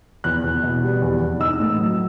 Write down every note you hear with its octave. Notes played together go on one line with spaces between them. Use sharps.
E2 F#6
E2
B2
G3
E2
E2
D#4 E6
A2
F#3